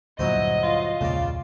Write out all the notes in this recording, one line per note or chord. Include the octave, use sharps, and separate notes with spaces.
D2 G2 A#2 F#3 E4 C5 D#5
F4
E1 C#2 A#2 C#3 D5